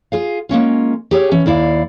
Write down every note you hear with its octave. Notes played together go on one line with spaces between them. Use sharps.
F4 G#4 F5
G#3 A#3 C#4 F4
G4 G#4 C#5
E3 C#4
D#2 E4 D5 F5